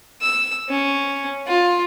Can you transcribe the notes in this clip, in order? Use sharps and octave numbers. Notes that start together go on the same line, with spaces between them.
E6
C#4
F4